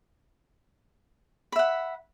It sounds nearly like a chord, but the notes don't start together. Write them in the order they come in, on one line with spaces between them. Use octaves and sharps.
B5 E5 F#5